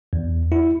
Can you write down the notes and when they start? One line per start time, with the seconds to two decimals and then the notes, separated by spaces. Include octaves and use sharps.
0.13 E2
0.52 E4